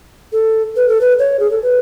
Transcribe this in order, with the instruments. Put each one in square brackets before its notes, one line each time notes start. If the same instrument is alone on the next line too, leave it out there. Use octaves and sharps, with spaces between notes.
[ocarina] A4
B4
A4
B4
C#5
G#4
A4
B4